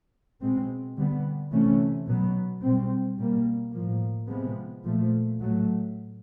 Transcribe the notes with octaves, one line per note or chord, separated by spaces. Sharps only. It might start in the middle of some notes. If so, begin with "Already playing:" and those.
B2 G#3 C4
D3 G3 B3
C3 E3 A3 C#4
B2 F#3 B3
B2 G3 C4
B2 G3 A#3
A2 F3 A#3
C3 F3 G#3 B3
A#2 F3 A3
A2 F#3 A3